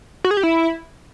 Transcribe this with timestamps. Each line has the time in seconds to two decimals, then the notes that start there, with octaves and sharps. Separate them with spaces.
0.24 F#4
0.31 G#4
0.37 G4
0.43 E4